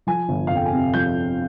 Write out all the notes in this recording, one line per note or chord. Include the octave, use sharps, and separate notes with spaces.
F3 G#5
G1
F2 F5
G5
G#5
C3
F3 G6